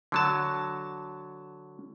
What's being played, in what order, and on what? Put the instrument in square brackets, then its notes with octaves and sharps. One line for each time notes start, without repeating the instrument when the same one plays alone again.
[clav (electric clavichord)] D3 F#3 A5